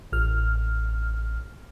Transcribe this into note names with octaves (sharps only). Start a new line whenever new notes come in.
A1 F6